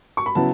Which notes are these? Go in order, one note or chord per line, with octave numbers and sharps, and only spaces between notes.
C#6
B5
C#3 F#3 B3 E4 A5